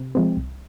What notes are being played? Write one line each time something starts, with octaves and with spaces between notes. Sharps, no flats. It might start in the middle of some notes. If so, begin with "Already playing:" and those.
Already playing: C3
F3 G#3 C4
C2